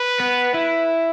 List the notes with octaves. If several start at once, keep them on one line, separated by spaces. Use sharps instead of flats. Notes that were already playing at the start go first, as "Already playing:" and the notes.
Already playing: B4
B3
E4